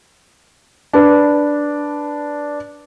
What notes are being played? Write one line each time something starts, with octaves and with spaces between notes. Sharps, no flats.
D4 B4